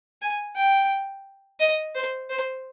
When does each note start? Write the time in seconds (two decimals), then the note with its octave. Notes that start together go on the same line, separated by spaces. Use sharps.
0.22 G#5
0.56 G5
1.60 D#5
1.95 C5
2.30 C5